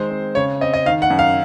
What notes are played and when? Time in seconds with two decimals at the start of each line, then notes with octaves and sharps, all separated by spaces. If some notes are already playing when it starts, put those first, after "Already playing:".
Already playing: D#3 G#3 C5
0.10 C4
0.35 C#3 C#5
0.61 C4 D#5
0.73 D#5
0.86 D#3 F5
1.02 F#5
1.10 F#2
1.19 F5